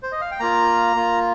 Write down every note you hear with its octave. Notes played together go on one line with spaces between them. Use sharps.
C5
D#5
F5
G5
A#3 F4 A#5
A#3 F4